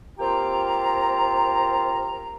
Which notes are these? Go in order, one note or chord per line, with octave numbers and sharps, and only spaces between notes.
A#3 C4 F4 G4 G5 A#5